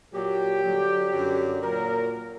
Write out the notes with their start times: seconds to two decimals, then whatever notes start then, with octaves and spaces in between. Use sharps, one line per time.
0.13 A#2 F#3 G4
0.63 G2 D3 F#3
1.12 F#2 D3 F#3
1.62 A#2 F#3 A#4